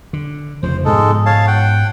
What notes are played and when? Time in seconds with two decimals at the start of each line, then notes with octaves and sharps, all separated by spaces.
0.13 D3
0.63 F1 C#3 F3 C5
0.85 G#2 B2 F3 G#3 D#4 A4
1.26 C#5 F5 A5
1.47 F#5 G5